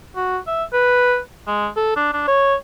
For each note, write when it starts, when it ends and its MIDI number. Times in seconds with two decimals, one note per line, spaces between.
0.16 0.37 66
0.47 0.63 76
0.73 1.18 71
1.47 1.68 56
1.76 1.96 69
1.96 2.11 62
2.13 2.23 62
2.28 2.55 73